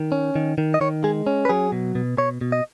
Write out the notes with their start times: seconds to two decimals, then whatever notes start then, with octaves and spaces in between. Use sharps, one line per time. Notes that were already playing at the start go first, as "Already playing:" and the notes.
Already playing: D#3
0.12 C#4
0.36 D#3
0.58 D#3
0.74 D#5
0.81 D#3 C#5
1.04 G#3 G#4
1.27 C#4
1.45 B4
1.49 F#3 G#4
1.72 B2
1.95 B2
2.18 B2 C#5
2.41 B2
2.52 D#5